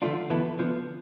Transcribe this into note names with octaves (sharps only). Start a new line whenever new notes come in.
D3 F3 A3 D4 F4
E2 B2 B3 E4 A4
D2 D3 F3 B3